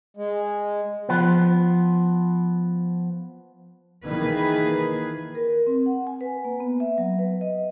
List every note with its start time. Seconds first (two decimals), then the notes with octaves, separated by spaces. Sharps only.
0.17 G#3
1.09 F3 B3
4.05 D#3 E3 A#3 G#4 B4
5.35 A#4
5.67 C4
5.86 F#5
6.07 G#5
6.21 B4
6.45 A#3
6.60 B3
6.80 E5
6.98 F#3
7.19 B4
7.41 D#5